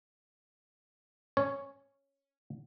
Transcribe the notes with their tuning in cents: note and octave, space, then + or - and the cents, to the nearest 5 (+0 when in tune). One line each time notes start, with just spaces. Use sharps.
C#4 -5 C#5 +0